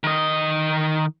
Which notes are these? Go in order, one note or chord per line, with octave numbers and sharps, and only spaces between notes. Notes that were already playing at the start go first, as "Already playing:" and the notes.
D#3 D#5